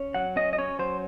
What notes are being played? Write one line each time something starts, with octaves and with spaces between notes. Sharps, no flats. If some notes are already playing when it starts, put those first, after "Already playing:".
Already playing: C#4
F#3 F#5
C#4 D#5
D#5
C#4 C#5
F#3 C5